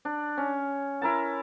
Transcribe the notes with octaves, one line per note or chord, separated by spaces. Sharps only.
D4
C#4
E4 A#4 A5